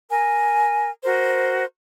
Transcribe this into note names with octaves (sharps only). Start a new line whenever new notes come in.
A#4 G#5
F#4 A#4 C5